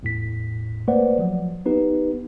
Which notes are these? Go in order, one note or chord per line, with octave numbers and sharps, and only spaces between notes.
E2 A2 B6
A3 A#3 B4 C5 D5 F#5
F3 F#3
B3 D#4 G4 B4